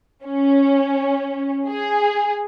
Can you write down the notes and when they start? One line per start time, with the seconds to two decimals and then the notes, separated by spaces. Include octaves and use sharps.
0.25 C#4
1.68 G#4